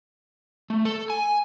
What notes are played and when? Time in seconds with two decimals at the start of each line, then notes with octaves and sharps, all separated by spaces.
0.70 A3
0.85 A4
1.10 G#5